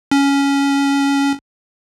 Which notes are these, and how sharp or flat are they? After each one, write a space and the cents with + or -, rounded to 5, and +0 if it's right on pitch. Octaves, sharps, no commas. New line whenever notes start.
C#4 +10